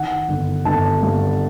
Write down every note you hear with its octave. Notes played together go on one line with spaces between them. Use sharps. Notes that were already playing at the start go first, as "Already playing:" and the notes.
Already playing: D#3 F#5
G1
G1 A5
G2